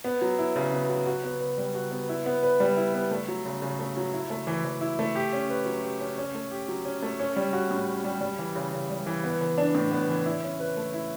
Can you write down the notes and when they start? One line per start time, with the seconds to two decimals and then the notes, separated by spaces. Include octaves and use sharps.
0.04 B3
0.21 F#3
0.39 E4
0.56 C#3
0.73 B3
0.89 F#3
1.07 F#4
1.24 B3
1.41 B4
1.58 G3
1.75 F#4
1.92 B3
2.09 E4
2.26 B3
2.43 B4
2.60 G3
2.77 E4
2.95 B3
3.11 A3
3.28 F#3
3.45 C#3
3.62 C#3
3.79 A3
3.97 F#3
4.13 E4
4.30 A3
4.47 E3
4.65 E3
4.81 E4
4.99 A3
5.15 G4
5.32 C#4
5.50 B4
5.66 F#3
5.83 G4
6.00 C#4
6.18 C#4
6.34 A3
6.51 G4
6.68 F#3
6.85 C#4
7.02 A3
7.20 C#4
7.36 G3
7.53 F#4
7.71 A2
7.88 C#4
8.04 G3
8.21 G3
8.39 E3
8.55 C#3
8.72 C#3
8.90 G3
9.06 E3
9.24 B3
9.41 E3
9.58 D4
9.75 A2
9.92 B3
10.09 E3
10.26 E4
10.43 C#4
10.60 B4
10.77 A3
10.94 E4